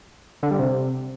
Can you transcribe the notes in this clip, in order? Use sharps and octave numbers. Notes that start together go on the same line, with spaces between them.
D3
G3
C3